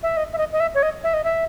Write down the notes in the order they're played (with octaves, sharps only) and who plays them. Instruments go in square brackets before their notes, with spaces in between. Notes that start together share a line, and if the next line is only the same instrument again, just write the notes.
[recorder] E5
D#5
E5
D#5
D#5
E5
C#5
D#5
E5
D#5
E5